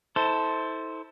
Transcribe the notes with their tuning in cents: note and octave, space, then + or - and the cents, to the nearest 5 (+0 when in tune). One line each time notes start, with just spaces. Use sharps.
E4 -35 A4 +0 C5 +0